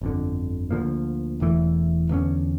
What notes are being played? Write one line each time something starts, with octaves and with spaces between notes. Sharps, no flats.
G1 F2 D3
D2 D3 F3 A#3
E1 E2 E3 A3
E2 D3 A3 C#4